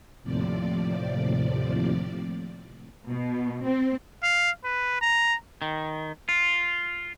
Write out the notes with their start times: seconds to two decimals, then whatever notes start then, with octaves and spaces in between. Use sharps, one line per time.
0.23 D#2 A2 C3 F3 D5
3.09 B2
3.65 C4
4.23 F5
4.64 B4
5.01 A#5
5.62 D#3
6.29 F4